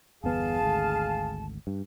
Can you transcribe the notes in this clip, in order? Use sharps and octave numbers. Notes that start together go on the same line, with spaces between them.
G1 E2 B3 G#4 F5 A5
G#1 D2 D3
G2